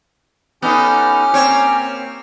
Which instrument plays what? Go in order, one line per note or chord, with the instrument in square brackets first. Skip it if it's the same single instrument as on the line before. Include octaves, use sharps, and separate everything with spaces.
[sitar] B3 D#4 A4 [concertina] C#4 G4 F6
[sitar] A#3 C4 C#5